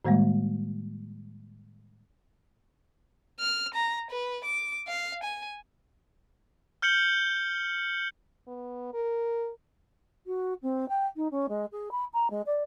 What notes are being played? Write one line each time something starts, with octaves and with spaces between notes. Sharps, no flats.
A2 D#3 G3 G#3 A#3
F6
A#5
B4
D6
F5
G#5
F6 G6 C#7 F#7 G7
B3
A#4
F#4
C4
G5
D#4
C#4
G#3
G#4
B5
A#5
G#3
D5